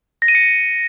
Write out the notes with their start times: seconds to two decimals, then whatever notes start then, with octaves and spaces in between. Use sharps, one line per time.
0.22 A#6
0.28 D#7
0.35 C#7